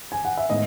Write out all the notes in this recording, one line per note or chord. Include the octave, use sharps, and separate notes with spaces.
G#5
F#5
E5
A2 G#3 B3 D#4 D#5